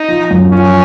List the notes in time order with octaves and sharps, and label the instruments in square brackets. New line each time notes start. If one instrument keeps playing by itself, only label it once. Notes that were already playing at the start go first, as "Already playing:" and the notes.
Already playing: [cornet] D#4
[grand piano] F3
F#2
[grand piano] F3 [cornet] C#4